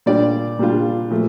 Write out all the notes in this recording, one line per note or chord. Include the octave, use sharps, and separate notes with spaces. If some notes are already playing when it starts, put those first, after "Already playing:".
A#2 G3 D4 F4 D5
A#2 G3 D4 F4
A#2 F3 A3